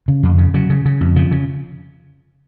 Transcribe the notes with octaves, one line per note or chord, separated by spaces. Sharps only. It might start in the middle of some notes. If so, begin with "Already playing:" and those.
C#3
F2
C#3
C#3 F#3
C#3
C#3
F2
C#3 F3
C#3